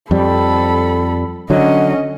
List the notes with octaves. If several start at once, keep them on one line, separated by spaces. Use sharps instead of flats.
F2 G3 A4 B5
D3 F#3 C#4 D#5